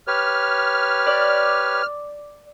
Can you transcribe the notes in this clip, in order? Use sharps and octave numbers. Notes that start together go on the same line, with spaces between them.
G4 B4 C#5 F6
D5